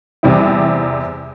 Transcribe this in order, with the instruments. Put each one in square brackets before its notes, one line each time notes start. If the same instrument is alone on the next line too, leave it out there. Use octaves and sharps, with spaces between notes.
[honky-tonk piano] E2 C3 G3 C4 E4